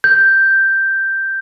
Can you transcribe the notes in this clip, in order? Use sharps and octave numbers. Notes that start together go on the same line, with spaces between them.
G6